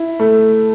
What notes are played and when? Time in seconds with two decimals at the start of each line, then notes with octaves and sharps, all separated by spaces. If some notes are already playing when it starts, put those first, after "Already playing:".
Already playing: E4
0.20 A3